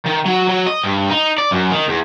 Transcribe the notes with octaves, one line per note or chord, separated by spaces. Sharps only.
D#3
F#3
F#3
D#5
G2
D#4
D5
F#2
D#3
E2